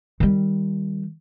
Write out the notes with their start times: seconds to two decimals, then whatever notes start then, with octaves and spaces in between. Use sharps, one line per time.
0.20 D#3 G3